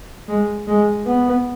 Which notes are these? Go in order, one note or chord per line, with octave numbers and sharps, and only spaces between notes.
G#3
G#3
B3